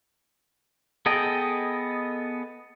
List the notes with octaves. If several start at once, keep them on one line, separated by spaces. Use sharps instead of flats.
B3 G#4 A4 D#5 G5